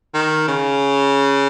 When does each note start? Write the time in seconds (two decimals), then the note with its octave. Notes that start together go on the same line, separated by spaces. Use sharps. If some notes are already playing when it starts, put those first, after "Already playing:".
0.14 D#3
0.48 C#3